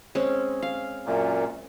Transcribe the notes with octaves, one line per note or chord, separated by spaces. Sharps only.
G#3 C4 C#4
F5
F#2 A#2